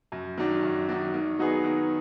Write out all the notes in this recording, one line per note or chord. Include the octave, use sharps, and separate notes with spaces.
F#2
D#3 F#3 D4
F#2
D#3 F#3 D4
D#3
F#3 B3 D#4 G#4
D#3